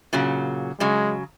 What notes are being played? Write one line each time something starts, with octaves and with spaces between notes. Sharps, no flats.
A#2 C#3 F#3
C#3 F#3 G#3